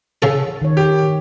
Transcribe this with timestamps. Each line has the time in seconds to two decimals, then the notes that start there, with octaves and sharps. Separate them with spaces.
0.22 C#3 A4
0.62 D#3 C#5
0.77 G4